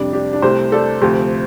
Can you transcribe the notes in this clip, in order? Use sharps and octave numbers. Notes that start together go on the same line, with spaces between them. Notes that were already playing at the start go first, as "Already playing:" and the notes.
Already playing: F2 C3 G3 D4
D4 G4
D4
C2 C3 A3 G4 C5
A4 D5
D2 C3 F3 A3 G4 C5